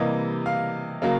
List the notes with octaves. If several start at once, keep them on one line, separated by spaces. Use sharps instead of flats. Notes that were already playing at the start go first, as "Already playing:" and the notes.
Already playing: C3 E3 G3 A#3 D#5
F5
C#3 F#3 A#3